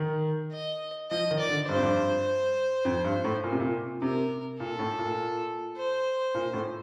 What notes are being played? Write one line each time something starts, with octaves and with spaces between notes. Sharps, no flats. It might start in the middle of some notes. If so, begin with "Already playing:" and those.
Already playing: D#3
D#5
F3 D#5
D#3
D5
D3
G2 C5
F2
G2
F2
G2
A2
A#2
C3
A#2
C3 A#4
A#2 A4
A2
A#2
C5
A#2
A2